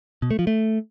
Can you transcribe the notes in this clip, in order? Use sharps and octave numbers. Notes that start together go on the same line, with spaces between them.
B2
A3
F3
A3